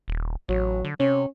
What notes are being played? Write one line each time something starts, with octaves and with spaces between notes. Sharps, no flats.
D#1
A1 F#3
D3
C3 C#4